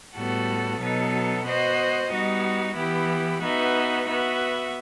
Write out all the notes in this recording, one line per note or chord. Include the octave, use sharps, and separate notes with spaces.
A2 G3 B3 F#4 A4
B2 F#3 B3 D#4 A4
B3 F#4 C5 D#5
G3 B3 D#4 F#4
E3 B3 E4 G4
B3 D#4 F#4 B4 E5
B3 F#4 B4 E5